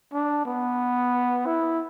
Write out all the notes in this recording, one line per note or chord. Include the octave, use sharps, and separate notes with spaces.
D4
B3
E4